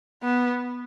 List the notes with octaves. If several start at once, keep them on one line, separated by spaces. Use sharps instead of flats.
B3